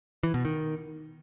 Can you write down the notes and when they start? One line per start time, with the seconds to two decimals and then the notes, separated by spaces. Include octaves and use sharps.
0.23 E3
0.34 B2
0.45 D#3